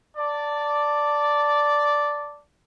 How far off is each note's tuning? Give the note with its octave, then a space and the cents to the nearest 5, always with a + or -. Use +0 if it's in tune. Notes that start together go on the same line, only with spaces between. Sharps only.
D5 -5 A5 +15